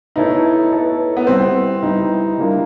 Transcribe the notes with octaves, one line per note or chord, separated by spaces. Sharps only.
B3 D#4 E4 A4 C#5
B3 E4 A4 C#5
B3
G3 B3 C4 E4
G3 B3 D#4 E4
G3 A#3 D4 F4